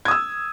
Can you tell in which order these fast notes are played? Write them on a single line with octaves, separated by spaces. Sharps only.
G#6 D#6 E6